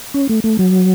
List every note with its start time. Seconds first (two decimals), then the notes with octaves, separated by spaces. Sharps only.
0.14 C#4
0.29 A3
0.44 A3
0.59 F#3